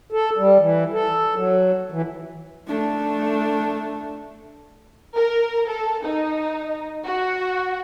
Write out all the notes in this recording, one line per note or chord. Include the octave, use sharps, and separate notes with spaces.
A4
G3
E3
A4
F#3
E3
A3 D4
A#4
A4
D#4
F#4